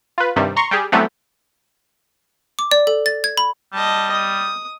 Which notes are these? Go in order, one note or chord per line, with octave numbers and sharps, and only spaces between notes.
F4 B4
G2 C3 D#3 G3
A#5 C6 C#6
G3 G4 G#4
E3 F#3 G3 A3 B3 C4
D6
D5
A4
A6
G#6
B5
G3 D#5 A5
D#6